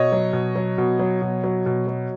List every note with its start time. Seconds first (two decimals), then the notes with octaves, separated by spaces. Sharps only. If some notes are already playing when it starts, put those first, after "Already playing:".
Already playing: B2 C#5 D#5
0.12 F#3
0.33 B2
0.56 F#3
0.78 B2
0.99 F#3
1.22 B2
1.44 F#3
1.66 B2
1.87 F#3